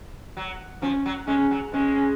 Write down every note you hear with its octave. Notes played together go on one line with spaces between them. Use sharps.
F#3
F3 C#4
F#3
G#3 C#4
F#3
G#3 C#4